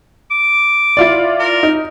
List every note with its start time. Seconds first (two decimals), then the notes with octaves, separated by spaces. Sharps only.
0.31 D6
0.97 E4 F4 D5
1.39 A#4
1.63 D#4